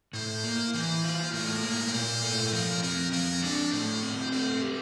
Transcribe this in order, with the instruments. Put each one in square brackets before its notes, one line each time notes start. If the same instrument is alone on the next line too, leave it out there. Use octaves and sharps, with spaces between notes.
[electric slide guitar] A2 [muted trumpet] C5
[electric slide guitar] A#3
[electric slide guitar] E3 [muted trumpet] C5
[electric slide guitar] F4
[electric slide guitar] A2 [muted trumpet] A#4
[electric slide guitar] A#3
[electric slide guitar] A#2 [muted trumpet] C5
[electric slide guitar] A3
[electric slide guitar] F3 [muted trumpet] A#4
[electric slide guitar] C4 [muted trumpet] A#4
[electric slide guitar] F3 [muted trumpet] A#4
[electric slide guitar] D4 [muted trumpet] A4
[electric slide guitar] A2 [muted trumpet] C5
[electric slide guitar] C4
[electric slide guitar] A3 [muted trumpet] C5
[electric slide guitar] G4